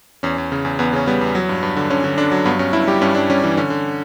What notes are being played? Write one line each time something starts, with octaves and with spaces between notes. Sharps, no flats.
E2 C#4
E2
C#3
E2
E2 B3
C#3 C#4
G3 B3
E2
F#3
G2
G2
D3
D3 C#4
D3
D3 D4
F#3
G2 B3
G2 C#4
G2 E4
G3 G4
G2 C#4
G2 D4
G3 C#4
E3 C#4
D3 C#4
D3